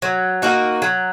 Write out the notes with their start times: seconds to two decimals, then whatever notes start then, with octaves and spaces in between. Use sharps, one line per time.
0.02 F#3
0.42 A#3 D#4 F#4
0.82 F#3